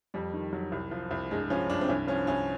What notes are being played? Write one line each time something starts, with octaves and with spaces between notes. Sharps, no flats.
F2 G3
D#3
F#3
C2
F3
C2
G2 G#3
F3 C#4
G2 D4
C4
C2 C#4
F3 C#4
C2 C#4